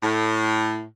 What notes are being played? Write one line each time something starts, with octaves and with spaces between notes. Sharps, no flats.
A2